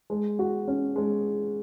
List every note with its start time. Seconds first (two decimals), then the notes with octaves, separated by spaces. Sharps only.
0.10 G#3
0.39 F#4
0.68 C#4
0.96 G#3